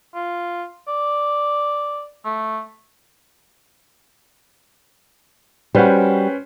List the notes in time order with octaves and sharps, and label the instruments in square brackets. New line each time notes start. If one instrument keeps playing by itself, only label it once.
[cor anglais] F4
D5
A3
[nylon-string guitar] G3 F#4 [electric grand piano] C#4 B4 C5